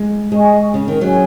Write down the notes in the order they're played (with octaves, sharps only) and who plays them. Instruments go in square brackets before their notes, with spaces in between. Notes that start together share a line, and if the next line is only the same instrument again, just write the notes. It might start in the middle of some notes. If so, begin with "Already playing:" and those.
Already playing: [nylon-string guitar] G#3
[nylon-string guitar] G#3 [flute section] G#4 D#5 G#5 C#6
[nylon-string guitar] C#3
D#3
[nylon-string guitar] F#3 [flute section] C#4 G#4 C#5 G#5